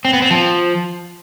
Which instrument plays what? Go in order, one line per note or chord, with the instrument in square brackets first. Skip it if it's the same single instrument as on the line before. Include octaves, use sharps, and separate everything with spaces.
[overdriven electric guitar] C4
B3
C4
F3